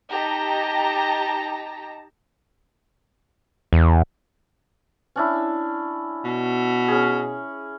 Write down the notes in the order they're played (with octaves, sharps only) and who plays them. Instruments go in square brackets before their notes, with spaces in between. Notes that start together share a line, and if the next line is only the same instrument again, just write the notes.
[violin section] D#4 G4 A5 A#5
[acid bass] E2
[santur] C#4 D4 E4
[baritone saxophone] B2
[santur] C#4 G#4